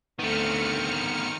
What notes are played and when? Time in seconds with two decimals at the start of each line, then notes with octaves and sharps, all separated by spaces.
0.19 D2 D3 D#3 A3 B3 C4 F6 C#7